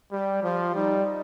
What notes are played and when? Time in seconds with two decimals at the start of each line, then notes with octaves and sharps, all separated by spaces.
0.12 G3 G4
0.43 F3 F4
0.75 G3 D#4